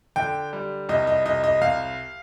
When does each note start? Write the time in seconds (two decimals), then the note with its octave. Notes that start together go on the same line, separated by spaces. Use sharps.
0.16 D3 G5
0.53 G3
0.89 C2 D#5
1.07 D#5
1.26 C2 D#5
1.44 D#5
1.61 C2 F5